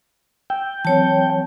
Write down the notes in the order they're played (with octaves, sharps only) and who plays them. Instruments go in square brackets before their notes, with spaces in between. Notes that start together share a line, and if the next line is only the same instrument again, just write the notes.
[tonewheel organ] G5 [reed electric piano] E6
[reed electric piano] E3 F#3 C4 [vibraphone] C#5 A5